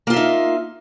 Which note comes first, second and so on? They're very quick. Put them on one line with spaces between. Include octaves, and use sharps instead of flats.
A#3 F4 E5 D#4